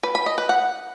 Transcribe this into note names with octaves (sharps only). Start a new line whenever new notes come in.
B4
B5
D#5
B4
F#5